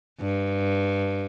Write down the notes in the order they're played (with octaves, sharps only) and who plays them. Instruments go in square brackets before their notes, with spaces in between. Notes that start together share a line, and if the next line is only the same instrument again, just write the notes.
[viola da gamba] G2